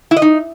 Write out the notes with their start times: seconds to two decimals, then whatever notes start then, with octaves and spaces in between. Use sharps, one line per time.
0.11 E4
0.17 D#5
0.22 D#4